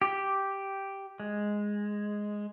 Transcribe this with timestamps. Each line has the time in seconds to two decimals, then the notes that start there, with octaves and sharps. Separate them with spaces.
0.02 G4
1.20 G#3